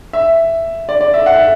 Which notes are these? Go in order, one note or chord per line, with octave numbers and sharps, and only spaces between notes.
E5
D5
D5
E5
F#5
E5